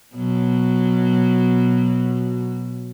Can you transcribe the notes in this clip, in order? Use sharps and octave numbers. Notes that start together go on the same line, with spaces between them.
B2 F#3